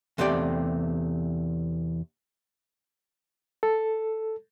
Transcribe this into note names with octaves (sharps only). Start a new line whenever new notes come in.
E2 C3 A3 G4 D5 G5
A4